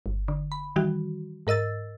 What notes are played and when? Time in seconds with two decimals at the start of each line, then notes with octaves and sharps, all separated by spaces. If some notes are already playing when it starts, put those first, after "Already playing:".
0.06 G1
0.28 D3
0.52 B5
0.76 D#3 E3 G3 F#4
1.47 G#2 A#4 D#5 E6 A6